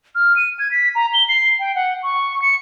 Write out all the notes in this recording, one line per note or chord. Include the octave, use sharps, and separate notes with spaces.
F6
D#7
G#6
B6
A#5
G7
C7
G5
F#5
C#6
C#7